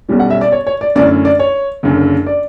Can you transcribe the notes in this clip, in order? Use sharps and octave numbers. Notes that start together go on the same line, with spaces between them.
B1 B2 G3 C#4
F#5
E5
D5
C#5
C#5
D5
F#2 D3 A3 C#4 E4 D5
D5
C#5
F#1 F#2 D3
D5